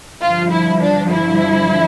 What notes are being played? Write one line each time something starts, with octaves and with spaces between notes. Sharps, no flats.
G2 D3 F3 F4
E4
D4
E4